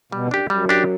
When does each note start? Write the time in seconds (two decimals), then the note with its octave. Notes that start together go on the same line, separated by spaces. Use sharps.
0.12 B2 G3
0.31 F#2 D4 G4
0.48 F#2 G3
0.69 D4 G4